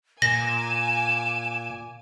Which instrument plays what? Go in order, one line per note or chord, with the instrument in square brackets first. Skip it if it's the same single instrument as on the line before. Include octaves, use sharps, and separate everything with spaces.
[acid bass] A#2 [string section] G#5 D6 [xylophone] A#6 [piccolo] E7